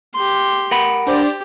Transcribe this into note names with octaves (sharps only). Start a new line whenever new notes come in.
G4 C6
A#4 F#5 B5
D4 G4 C5 D5